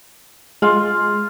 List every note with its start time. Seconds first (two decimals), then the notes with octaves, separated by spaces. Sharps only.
0.62 G#3 F4 F5